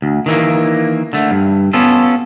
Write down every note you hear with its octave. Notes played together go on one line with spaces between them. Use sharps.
D2
D#3 E3 A#3
D3 A3
G2
B3 C#4 F4 A4